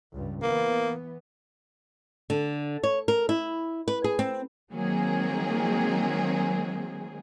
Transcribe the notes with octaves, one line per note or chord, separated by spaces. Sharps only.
C#2 G2
E3 A#3 B3
D3
C#5
A#4
E4
B4
G#4
C4
D#3 F#3 G#3 A#3 C4 G#4